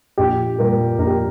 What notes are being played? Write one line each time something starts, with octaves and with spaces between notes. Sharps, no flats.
A#1 G4
A#2 G3 A#3 A#4
A#1 A#4
G4